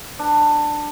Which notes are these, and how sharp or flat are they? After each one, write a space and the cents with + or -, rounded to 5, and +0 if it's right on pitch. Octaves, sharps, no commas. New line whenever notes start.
D4 +15